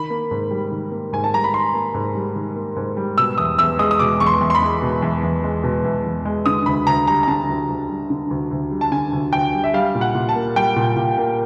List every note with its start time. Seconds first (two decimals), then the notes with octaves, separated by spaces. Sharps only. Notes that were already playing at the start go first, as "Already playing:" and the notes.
Already playing: D#3 B5
0.10 A#3
0.31 G#2
0.51 G3
0.71 D#3
0.92 A#3
1.13 G#2 G#5
1.24 A5
1.33 G3 A#5
1.44 B5
1.53 D#3 C6
1.74 A#3
1.94 G#2
2.15 G3
2.35 D#3
2.56 A#3
2.76 G#2
2.97 G3
3.18 B2 E6
3.38 E2 D#6
3.58 E2 E6
3.79 G#3 D#6
3.91 D#6
3.99 B2 D6
4.20 E2 C#6
4.27 C6
4.41 E2
4.50 C6
4.55 B5
4.62 G#3
4.82 B2
5.02 E2
5.23 E2
5.43 G#3
5.63 B2
5.84 E2
6.05 E2
6.25 G#3
6.46 D3 D#6
6.66 D2 B5
6.87 D2 A#5
7.07 G3 A#5
7.23 A#5
7.28 D3 A5
7.49 D2
7.69 D2
7.90 G3
8.10 D3
8.31 D2
8.51 D2
8.71 G3
8.81 A5
8.91 D3 G#5
9.13 D2
9.33 D2 G5
9.54 G3
9.64 E5
9.74 G3 F5
9.95 A#2
10.01 F#5
10.15 A#2
10.29 A5
10.35 A#3
10.56 G3 G5
10.76 A#2
10.96 A#2
11.17 A#3